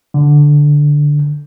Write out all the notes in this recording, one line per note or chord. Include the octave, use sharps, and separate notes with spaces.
D3